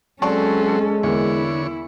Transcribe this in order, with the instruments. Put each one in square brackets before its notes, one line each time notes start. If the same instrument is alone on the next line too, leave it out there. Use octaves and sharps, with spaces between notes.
[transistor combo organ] F#3 C4 [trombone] G#3 [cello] C#4 A4 [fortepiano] D5 A5 C#6
[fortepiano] E2 A#3 [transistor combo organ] D3 C#5 [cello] E4